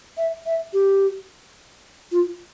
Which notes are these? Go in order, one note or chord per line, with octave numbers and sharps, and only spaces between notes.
E5
E5
G4
F4